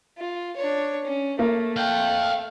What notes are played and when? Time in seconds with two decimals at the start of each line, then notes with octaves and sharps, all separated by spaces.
0.18 F4
0.56 D4 C#5
1.04 C#4
1.39 A3 A#3
1.76 F5 G5